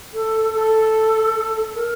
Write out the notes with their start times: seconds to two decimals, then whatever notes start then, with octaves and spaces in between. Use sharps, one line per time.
0.13 A4
0.54 A4
1.74 A#4